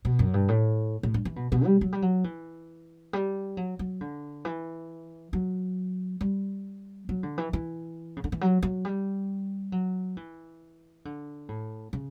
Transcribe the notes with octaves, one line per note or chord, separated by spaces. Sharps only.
B2
F#2
G2
A2
A2
G2
E3
B2
B2
G3
F#3
G3
F#3
E3
G3
F#3
F#3
D3
E3
F#3
G3
F#3
D3
E3
E3
C#3
D3
E3
F#3
F#3
G3
F#3
E3
D3
A2
C#3